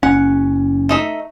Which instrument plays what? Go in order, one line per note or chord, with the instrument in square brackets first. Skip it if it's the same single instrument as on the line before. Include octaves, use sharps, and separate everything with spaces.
[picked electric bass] F#1 C#4 [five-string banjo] F#5
[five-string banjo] A3 D#4 E5